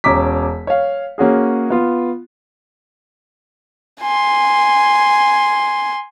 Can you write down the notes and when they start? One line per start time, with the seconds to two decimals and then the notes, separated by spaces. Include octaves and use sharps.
0.04 E1 C#4 A#5 D6 B6
0.67 C#5 F5
1.18 A#3 C#4 F#4 G#4
1.70 B3 F4
4.01 G#5 C6